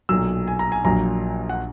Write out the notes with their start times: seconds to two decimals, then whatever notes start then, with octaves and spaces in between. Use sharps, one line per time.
0.09 B1 A#2 F#3 E6
0.48 G#5
0.59 A#5
0.72 G#5
0.85 A#1 A#2 F#3 A#5
1.49 F#5